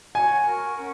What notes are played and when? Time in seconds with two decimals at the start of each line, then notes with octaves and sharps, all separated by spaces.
0.15 F#4 C#5 F#5 G#5 A#5
0.45 A#4 F#5 C#6
0.75 C#4 A#4 F#5 A#5